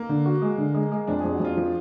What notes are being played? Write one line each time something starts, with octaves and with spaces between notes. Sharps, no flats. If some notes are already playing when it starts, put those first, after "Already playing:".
Already playing: A#3
D3
F#4
G#3
D3
G#3
G#3
F2 D4
F2 G#4
F#4
F2 F4
F3